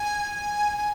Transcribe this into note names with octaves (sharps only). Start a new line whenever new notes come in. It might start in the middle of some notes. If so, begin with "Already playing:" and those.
Already playing: G#5
G#5